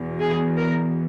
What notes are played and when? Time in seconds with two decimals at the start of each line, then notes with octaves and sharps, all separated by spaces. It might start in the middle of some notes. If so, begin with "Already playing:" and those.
Already playing: E2 B2
0.19 G#4
0.57 A#4